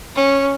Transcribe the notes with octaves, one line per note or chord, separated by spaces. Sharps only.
C#4